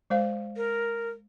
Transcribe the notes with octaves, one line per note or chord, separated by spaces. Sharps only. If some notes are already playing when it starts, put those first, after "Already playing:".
G#3 C5 F5
A#4